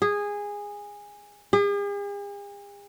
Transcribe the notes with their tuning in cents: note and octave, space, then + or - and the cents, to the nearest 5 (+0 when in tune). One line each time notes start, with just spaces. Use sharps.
G#4 -15
G#4 -45